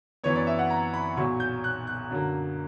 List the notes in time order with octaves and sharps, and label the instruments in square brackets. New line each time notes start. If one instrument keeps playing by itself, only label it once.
[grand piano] F#2 E3 B3 C#5
D5
E5
F#5
A#5
B5
B1 A#2 F#3 C#6
G6
F#6
F#6
F#2 D3 F#3 A#3